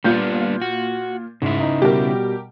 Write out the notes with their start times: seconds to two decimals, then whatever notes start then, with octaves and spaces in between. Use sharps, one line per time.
0.04 A#2 G3 B3 D4 F4 G6
0.62 F#4
1.42 G#2 C#3 E4
1.60 D#4
1.82 B2 G3 G4 A#4